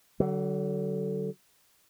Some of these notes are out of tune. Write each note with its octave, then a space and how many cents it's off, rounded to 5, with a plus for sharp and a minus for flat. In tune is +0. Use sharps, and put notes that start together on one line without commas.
D3 +0 F#3 +35